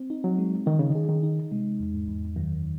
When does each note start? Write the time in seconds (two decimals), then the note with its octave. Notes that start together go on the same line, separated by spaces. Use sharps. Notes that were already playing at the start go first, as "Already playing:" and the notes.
Already playing: C4
0.10 D#4
0.24 F#3
0.38 G#3
0.66 D#3 D#4
0.79 C#3
0.90 D#3
0.95 G#4
1.09 D#3
1.23 D#4
1.52 C3 G#3
1.80 E2
1.94 G#2
2.08 E2
2.36 F#2 D#3